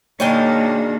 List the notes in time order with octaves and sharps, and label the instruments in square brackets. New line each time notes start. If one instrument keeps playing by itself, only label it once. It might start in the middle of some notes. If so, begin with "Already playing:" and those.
[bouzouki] B2 G#3 D4 [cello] D#3 A#3 [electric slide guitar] C#5 G5